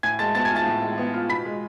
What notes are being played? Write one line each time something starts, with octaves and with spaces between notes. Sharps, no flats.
A2 G#5 G#6
G#3 A5 A6
B3 A5 A6
G#5 G#6
F4
A5 A6
A2
G#3
B3
F4
B2 B5 B6
G#3